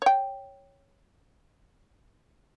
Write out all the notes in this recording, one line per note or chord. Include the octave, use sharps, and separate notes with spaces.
C#5 G5